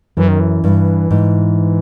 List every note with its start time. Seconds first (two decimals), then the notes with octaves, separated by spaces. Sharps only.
0.17 F#2 E3
0.28 D#3
0.40 E3
0.64 G2
1.11 G#2